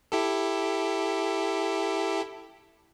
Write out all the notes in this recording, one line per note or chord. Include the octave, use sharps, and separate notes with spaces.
E4 G4 A4